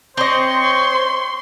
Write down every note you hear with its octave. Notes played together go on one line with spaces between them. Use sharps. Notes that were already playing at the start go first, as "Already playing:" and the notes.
C4 C5 C#5 D#5 C6 C#6